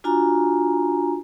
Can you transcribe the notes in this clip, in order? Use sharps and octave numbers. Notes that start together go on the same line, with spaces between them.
D4 F4 F#4 G#5 A#5